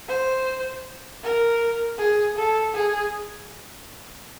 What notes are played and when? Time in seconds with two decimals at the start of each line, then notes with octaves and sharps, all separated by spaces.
0.09 C5
1.23 A#4
1.99 G#4
2.36 A4
2.74 G#4